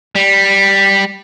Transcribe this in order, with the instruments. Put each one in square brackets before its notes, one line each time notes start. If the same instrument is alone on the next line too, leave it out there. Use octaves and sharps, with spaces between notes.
[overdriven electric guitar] G3